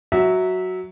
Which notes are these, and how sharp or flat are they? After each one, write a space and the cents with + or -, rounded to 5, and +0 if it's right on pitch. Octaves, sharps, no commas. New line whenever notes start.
F#3 +0 E5 -15